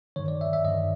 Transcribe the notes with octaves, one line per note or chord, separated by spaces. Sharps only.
G2 D#3 C#5
D5
E5
E5
G2 D#3 D#5